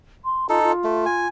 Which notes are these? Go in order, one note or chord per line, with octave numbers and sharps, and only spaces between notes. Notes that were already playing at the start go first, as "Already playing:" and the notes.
C6
D#4 F4 A4
F4
A3
G#5